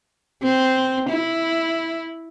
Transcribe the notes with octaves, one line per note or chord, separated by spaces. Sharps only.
C4
E4